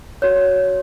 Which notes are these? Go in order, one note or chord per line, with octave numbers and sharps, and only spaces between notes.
F#4 C#5